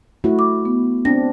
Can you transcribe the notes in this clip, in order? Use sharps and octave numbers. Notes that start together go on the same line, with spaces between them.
A3 E4 F#4
D6
B3
C4 D4 A#6